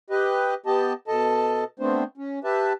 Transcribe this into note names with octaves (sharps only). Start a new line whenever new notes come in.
G4 B4 D#5
B3 G4 D#5 A5
B2 A4 D#5 A5
A3 B3 C4 D4 C5
C#4
G4 B4 E5 A5